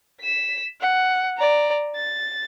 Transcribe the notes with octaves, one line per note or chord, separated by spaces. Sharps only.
B6 E7
F#5
D5 A#5
A6